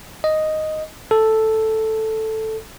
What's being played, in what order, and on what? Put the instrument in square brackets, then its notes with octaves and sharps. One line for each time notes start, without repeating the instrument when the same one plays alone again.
[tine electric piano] D#5
A4